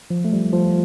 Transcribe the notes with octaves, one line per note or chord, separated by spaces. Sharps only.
F3
A3
G3
F3